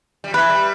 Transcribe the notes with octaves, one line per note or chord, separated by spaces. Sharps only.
G3
E3 B4
G3